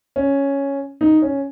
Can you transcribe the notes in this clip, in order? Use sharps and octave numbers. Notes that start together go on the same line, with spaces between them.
C#4
D#4
C#4